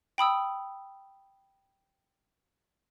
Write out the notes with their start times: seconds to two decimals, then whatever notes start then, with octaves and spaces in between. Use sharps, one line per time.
0.18 G5 B5 D#6 E6